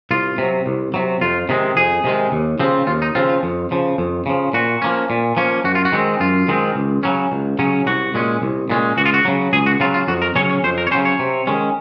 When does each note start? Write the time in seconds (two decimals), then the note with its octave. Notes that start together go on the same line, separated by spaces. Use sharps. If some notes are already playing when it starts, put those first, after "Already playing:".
0.11 C2 F4
0.38 C3 F#3
0.66 C2
0.94 C3 F#3
1.21 F2 F4
1.49 C3 D#3 G#3
1.76 F2 G#4
2.04 C3 D#3 G#3
2.32 D#2
2.60 C#3 F3 C4
2.87 D#2 F4
3.02 D#4
3.15 C#3 F3 C4 F4
3.29 F4
3.43 F2
3.71 C#3 F3
3.98 F2
4.26 C#3 F3
4.53 A#2 F#4
4.82 F3 A#3 C#4
5.10 A#2
5.37 F3 A#3 C#4
5.64 F#2 F#4
5.75 F4
5.85 F#4
5.92 D#3 G#3 C4
6.20 F#2 F4
6.48 D#3 G#3 C4
6.76 C#2
7.03 C#3 F#3 C#4
7.32 C#2
7.59 C#3 F#3 C#4
7.86 C2 F#4
8.14 A#2 G#3 C#4
8.42 C2
8.70 A#2 G#3 C#4
8.97 C#2 F#4
9.06 F4
9.14 F#4
9.25 C#3 F#3
9.53 C#2 G#4
9.66 F#4
9.80 C#3 F#3 F4
9.94 F4
10.08 F2 F#4
10.22 A#4
10.35 C#3 F#3 C#4 C#5
10.50 C#5
10.64 F2 C5
10.78 A#4
10.87 C#5
10.91 C#3 F#3 C#4 C5
11.05 C#5
11.19 C3
11.47 D#3 G#3 C#4